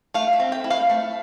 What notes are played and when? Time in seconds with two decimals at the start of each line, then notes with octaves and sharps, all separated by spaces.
0.14 A3 F5
0.33 E5
0.40 C4
0.52 G5
0.64 E4
0.71 F5
0.90 A3